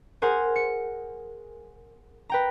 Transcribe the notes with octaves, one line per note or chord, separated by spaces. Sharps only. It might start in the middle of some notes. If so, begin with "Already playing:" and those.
G#4 A#4 C5 F#5 G#5
C#7
B4 G5 A#5